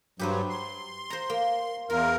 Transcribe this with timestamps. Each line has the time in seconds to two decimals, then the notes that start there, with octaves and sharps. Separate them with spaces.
0.19 G2 F#3 G4 B4 C5
0.50 C6
1.10 C5 A#5
1.30 A#3
1.90 E2 F4 A#4